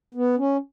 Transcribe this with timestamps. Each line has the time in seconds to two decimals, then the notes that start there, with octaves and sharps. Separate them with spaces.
0.14 B3
0.38 C#4